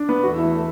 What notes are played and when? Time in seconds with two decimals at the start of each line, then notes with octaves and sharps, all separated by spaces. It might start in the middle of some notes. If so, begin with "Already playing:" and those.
Already playing: D4
0.09 B3
0.23 E2 E3 A3 F#4
0.38 E4